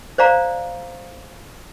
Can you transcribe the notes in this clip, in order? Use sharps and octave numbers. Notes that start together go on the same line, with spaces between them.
C5 D5 F5 A#5